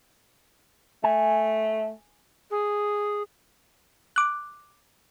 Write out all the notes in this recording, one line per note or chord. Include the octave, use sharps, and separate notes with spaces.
A3 G#5
G#4
D6 F#6